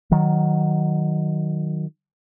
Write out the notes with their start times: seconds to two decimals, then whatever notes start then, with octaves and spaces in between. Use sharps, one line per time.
0.11 D#3 F#3